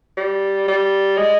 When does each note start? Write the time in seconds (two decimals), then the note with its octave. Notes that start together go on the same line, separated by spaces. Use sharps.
0.17 G3
0.68 G3
1.17 G#3